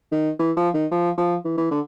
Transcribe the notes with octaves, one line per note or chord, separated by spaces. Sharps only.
D#3
E3
F3
D#3
F3
F3
E3
E3
D3